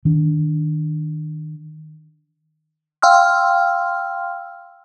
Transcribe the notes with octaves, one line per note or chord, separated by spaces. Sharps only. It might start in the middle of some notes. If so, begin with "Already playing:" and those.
D#3 D4
F5 G5 C6 E6 F6